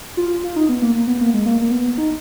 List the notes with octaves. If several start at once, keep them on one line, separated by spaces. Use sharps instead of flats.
F4
F4
D#4
B3
A#3
A#3
B3
A#3
G#3
A#3
A#3
B3
D#4